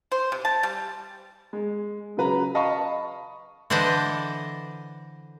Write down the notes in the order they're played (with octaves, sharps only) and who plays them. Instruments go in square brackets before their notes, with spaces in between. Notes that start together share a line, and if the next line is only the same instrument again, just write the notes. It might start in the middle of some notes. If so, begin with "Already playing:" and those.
[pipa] C5
C3
A5
G3
[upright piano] G#3
C#3 F#3 B4 A#5
D#5 F5 A5 B5 C#6
[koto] D3 E3 D4 C5 D5 D#5